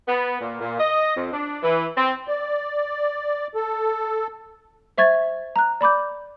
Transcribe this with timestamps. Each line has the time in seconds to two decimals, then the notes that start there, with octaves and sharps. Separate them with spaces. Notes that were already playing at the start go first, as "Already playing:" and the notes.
0.08 B3
0.40 A#2
0.61 A#2
0.80 D#5
1.16 F2
1.32 D4
1.63 E3
1.96 C4
2.28 D5
3.55 A4
4.98 C5 E5 C#6 G#6 A6
5.56 A#5 F#6
5.81 D5 B5 D6 G6